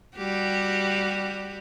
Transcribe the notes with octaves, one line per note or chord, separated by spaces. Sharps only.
G3 F#4 G4